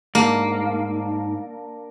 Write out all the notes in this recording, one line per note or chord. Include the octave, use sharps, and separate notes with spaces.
G#2 A#3 D4 A#4 E6